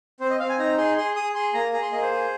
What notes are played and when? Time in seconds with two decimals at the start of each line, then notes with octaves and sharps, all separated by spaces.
0.20 C4 C5
0.30 D#5
0.40 C4 F5
0.49 G#5
0.59 D#4 A#5
0.78 G#4 C6
0.97 G#4 C6
1.16 G#4 D#6
1.35 G#4 C6
1.54 A#3 A#5
1.73 G#4 A#5
1.82 C6
1.92 A#3 D#5
2.02 C5
2.11 G#4